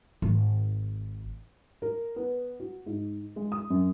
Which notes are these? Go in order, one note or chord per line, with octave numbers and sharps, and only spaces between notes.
G#1
A#4
B3
F#4
G#2
G#3
D#6
F#2